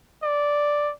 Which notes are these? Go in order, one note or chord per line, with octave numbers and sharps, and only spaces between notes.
D5